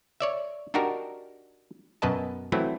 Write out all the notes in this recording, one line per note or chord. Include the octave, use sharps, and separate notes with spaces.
C#5 D5 E5
D4 D#4 F#4 G4 A#4
F#2 B2 B4 D#5 A5
E3 F#3 A3 C4 E4